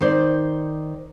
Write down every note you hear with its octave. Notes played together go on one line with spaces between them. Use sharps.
D#3 C5 D5